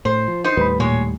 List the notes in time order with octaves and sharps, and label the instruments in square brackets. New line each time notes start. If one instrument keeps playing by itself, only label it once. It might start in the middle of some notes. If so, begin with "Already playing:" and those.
[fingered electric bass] A2 [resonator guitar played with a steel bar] C5
[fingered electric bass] F3
[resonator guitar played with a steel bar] D#4 C5
[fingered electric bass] D#2 A2 G3 [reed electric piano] B4 B5
[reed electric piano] A#2 [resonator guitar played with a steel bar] G#3 C#5